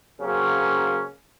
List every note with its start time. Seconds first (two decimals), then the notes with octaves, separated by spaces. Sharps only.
0.21 C#3 F#3 A#3 C4 C#4